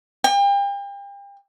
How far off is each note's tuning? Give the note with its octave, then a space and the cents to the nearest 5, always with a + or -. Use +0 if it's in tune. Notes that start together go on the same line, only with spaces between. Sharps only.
G5 +35